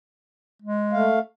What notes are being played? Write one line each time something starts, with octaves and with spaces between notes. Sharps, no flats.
G#3
A3 F5